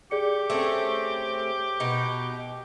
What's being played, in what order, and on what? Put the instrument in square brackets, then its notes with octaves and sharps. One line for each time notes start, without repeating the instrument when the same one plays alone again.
[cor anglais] G4 [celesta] G#4 D5 C#7
[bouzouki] A3 C4 C#4
B2 D#4